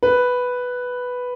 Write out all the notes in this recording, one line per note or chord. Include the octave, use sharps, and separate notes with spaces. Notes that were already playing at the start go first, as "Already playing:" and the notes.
B4